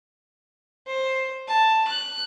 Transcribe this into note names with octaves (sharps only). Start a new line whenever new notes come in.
C5
A5
F#6